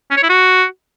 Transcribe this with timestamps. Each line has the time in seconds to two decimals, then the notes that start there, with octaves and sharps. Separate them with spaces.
0.11 C#4
0.17 C#5
0.23 E4
0.29 F#4